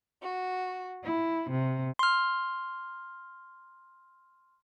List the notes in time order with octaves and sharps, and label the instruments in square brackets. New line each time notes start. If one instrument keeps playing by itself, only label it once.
[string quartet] F#4
E4
C3
[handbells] C6 F6